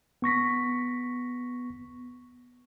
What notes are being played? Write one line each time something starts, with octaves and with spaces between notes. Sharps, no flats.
B3 C#6 A#6 B6